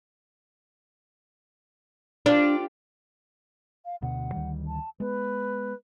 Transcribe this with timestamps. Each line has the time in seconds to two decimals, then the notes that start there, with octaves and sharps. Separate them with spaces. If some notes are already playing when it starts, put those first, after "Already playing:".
2.26 D4 F4 G4 D5
3.85 F5
4.02 D2 B2 F#5
4.32 D2 D#3 G3
4.67 A5
5.00 G#3 B3 B4